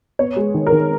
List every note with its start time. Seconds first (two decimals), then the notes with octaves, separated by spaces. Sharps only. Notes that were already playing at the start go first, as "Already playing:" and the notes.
0.19 B3 C#5
0.36 G#3
0.54 D#3
0.67 A#4
0.72 D#3